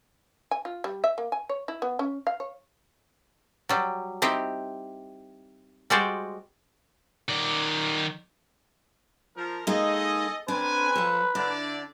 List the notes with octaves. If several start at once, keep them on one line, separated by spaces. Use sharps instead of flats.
G#5
F4
G3
E5
A#3
G#5
C#5
E4
B3
C#4
F5
C#5
F#3 G3
C4 D#4 E4 G4
G3 G#3 F#4 C5 D5
D#3 D5
F3 A#4
G#3 A#3 D#4 G#4 A4 D#5
C4 D4 B4 G#5
F3 A4
D3 D4 E4 D5